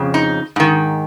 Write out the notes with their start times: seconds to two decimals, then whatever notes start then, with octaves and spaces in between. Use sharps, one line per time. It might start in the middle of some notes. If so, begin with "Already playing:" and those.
Already playing: F2 C#3
0.14 D#4
0.56 G#2 D#3